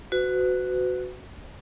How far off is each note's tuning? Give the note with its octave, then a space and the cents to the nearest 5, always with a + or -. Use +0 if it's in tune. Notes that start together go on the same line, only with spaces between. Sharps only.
F#4 +0 B4 +35